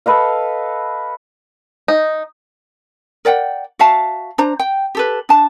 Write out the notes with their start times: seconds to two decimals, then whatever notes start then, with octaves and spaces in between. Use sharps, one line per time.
0.06 A4 B4 D#5 F5
1.88 D#4
3.25 A#4 D5 F#5 G5
3.79 F#4 E5 F5 A5
4.38 D4 C5 A#5
4.59 G5
4.95 G4 A4 B4
5.29 D4 A5